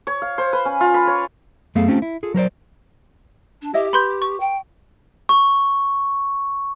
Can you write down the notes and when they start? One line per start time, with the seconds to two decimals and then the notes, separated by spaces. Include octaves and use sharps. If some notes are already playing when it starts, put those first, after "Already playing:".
0.07 C#5
0.22 F5
0.38 C5
0.53 B4
0.65 C#4
0.81 F4
0.94 B5
1.07 C#5
1.75 F#2 A3 B3 G#4 A4 F5
1.88 A3 C4 C#4 F4 G4
2.02 E4
2.23 F4 G#4 A4
2.34 F#3 A#4 C5 D5
3.62 D4
3.74 E4 G4 D#5 E5
3.93 B4 B5 C6 G6
4.22 C#6
4.40 G5
5.29 C#6